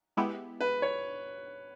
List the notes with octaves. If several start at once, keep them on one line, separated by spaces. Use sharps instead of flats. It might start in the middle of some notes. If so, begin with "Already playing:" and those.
G#3 B3 E4 G4
B4
C#5